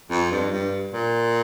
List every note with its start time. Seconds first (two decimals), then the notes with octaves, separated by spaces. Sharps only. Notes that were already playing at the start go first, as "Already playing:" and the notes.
0.10 F2
0.31 G2
0.52 G2
0.93 A#2